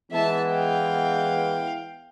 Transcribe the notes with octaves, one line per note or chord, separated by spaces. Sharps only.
E3 G#3 B3 E5 A5
F5 G5